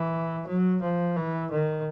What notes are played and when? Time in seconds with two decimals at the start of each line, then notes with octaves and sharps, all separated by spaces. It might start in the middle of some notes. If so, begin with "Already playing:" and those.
Already playing: E3
0.48 F#3
0.82 F3
1.17 E3
1.52 D#3